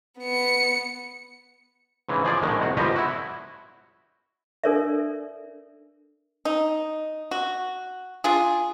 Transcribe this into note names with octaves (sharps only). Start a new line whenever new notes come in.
B3 C#7
G#2 C#3 E3
F3 G#4 D5
A#1 A2 D#3 G#3
C2 F#4
G1 G#2 F3 G3 G4 D#5
E4 F#4
D4 A4 A#4 C#5 D5 E5
D#4
F#4
D4 F4 G#4